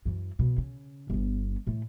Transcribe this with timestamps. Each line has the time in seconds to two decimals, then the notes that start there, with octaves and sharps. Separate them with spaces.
0.05 F#2 E3
0.39 B2 F3
0.58 C#3
1.10 G1 B3
1.67 A2 A3